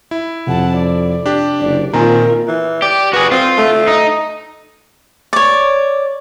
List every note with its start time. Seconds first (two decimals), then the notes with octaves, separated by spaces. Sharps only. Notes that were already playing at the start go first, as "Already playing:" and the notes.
0.11 E4
0.47 F2 C3 F#5 A5
0.77 D5
1.26 D4 G4
1.61 F#1 D5
1.93 A#2 D#3 C4 F4 A#4 G#5 A#5
2.48 E3
2.82 G4 D5
3.13 F#4 G#4 B4
3.32 C4 F4
3.58 A3
3.87 D#4
5.33 C#5 D5